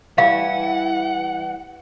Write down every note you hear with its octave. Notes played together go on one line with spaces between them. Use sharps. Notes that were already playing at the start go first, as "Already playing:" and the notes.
E3 G3 F5 F#5